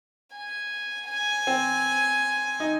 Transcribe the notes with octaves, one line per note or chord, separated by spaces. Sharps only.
G#5
G#5
C4
D#4